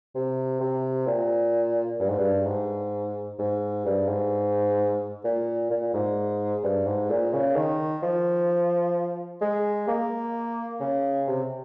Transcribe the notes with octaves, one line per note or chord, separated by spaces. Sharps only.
C3
C3
A#2
G2
G#2
G2
G#2
G#2
G2
G#2
A#2
A#2
G#2
G2
G#2
A#2
C#3
D#3
F3
G#3
A#3
C#3
C3